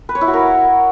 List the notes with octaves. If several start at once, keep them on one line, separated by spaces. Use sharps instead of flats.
B4
C#5
E4
F#4
A#4